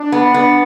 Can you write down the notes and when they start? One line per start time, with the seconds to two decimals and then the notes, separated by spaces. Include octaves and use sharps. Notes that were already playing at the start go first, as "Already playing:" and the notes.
Already playing: D4
0.12 B3
0.34 B3